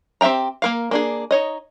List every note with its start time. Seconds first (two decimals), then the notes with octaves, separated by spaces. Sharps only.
0.21 C4 G4 E5 G5 A#5
0.62 A#3 A#4 F5
0.91 A#3 D4 G#4
1.31 D#4 C#5 D#5